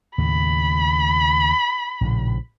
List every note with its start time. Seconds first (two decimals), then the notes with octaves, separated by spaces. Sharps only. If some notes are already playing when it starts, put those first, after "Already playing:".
0.18 D#2 A2 C#3 B5
2.01 A#1 A2 C#3